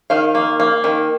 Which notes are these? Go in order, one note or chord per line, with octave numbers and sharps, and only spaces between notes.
D#3 F5
A#3
A#3
D#3